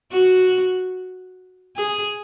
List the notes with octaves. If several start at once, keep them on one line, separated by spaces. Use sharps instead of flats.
F#4
G#4